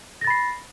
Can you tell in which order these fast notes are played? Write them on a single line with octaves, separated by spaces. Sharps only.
A#6 A6 B5 C7